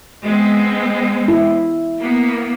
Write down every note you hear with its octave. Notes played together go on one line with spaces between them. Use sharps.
G#3 B3 C4
E4
A#3 B3